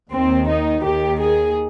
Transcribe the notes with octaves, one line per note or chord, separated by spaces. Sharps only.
D#2 D#3 C4
D#4
D#2 D#3 G4
G#4